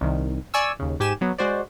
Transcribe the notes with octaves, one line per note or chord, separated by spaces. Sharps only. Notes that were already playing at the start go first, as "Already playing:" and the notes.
C2 D#3
D5 G#5 C#6 E6
D#2 C#3
G#2 G4 G#5 E7
F#3 B3
G#3 F#4 C5 D5